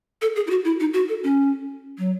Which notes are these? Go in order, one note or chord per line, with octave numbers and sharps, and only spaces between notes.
A4
G#4
E4
F#4
E4
D#4
F#4
A4
C#4
F#3